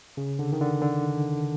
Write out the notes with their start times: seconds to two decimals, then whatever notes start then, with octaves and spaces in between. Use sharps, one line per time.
0.17 C#3
0.39 D3
0.53 D#3
0.61 D3
0.82 D3